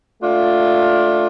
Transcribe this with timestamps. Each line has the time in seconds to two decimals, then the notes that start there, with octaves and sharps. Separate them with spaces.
0.22 A3 D4 F4